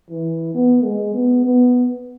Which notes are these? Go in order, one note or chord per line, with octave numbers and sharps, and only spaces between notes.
E3
B3
G#3
B3
B3